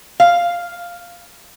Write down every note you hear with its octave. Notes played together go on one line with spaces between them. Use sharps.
F5